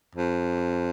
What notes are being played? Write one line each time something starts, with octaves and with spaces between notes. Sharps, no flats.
F2